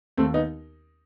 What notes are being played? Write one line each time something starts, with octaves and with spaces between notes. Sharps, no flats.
D#2 A3 C4
B3 D#4